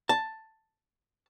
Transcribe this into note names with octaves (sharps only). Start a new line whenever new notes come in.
A5